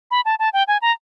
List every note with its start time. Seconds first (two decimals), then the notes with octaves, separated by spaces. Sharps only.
0.11 B5
0.25 A5
0.39 A5
0.53 G5
0.68 G#5
0.82 A#5